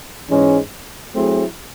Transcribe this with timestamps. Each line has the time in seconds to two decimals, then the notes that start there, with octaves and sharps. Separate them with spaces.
0.30 G#2 E3 G#3 C#4
1.15 F#3 A3 C4 E4 G#4